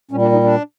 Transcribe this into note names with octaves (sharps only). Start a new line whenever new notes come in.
A#2 G3 C#4
D4
D#4
D4